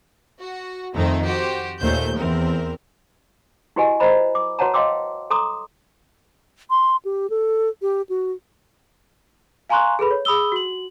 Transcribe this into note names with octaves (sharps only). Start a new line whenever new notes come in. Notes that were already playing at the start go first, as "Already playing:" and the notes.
F#4
F2 D#3 A3 C4 D#4
F#4 G4 C5
D#2 A#2 A3 C5 G6
E2 E3 C4 A#4
E4 F#4 G4 B4 D#5 G#5
A#4 C5 D#5 A#5 B5
D6
F#4 B4 C#5 F#5 A5 A#5
D#5 F5 G5 C6 D6 E6
A4 A#5 C6 D6 D#6
C6
G4
A4
G4
F#4
F5 G#5 A#5 C6 C#6 F#6
G#4 A4 B4 B5
C#5
G#4 B5 D#6 E6 G7
F#4 F#7